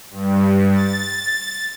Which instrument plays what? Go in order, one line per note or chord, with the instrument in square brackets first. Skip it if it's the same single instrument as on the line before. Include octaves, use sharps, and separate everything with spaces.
[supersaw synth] G2
A6